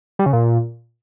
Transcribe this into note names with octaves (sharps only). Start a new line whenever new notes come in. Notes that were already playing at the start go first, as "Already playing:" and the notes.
G3
C#3
A#2